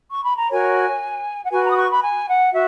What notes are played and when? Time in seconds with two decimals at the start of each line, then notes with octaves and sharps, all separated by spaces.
0.10 C#6
0.23 B5
0.36 A#5
0.50 F#4 A#4 C#5 G#5
1.44 F#5
1.51 F#4 B4 G#5
1.64 A#5
1.70 D#6
1.76 C#6
1.89 B5
2.02 G#5
2.27 F#5
2.52 F#4 E5